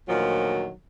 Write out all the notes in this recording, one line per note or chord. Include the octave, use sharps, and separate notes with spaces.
D2 A#2 D#3 F3 F#3